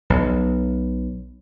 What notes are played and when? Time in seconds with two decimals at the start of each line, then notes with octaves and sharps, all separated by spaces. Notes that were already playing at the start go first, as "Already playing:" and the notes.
0.10 B1